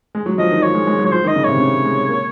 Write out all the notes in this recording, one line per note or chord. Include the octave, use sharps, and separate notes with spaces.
G#3
F#3
F3 D#5
D#3
F3 C#5
G#3
G#3
F#3
C#5
F3 C5
D#3
D#5
C#3
C3 C#5
C#3
G#3
A#3